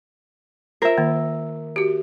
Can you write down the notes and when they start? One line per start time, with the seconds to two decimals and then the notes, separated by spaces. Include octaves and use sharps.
0.82 F4 A#4 C5 E5
0.98 D#3 A#3
1.76 F#4 G4